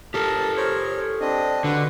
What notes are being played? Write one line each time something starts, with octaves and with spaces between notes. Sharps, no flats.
G4 A4 A#4 A5
A#4 C5 C#5
C4 D4 D#5
D3 F#4 B4